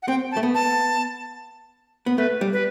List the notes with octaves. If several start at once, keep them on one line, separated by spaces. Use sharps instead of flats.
F#5
C4 G5
A5
A3
B3
A5
B3
A3 B4
G3
B4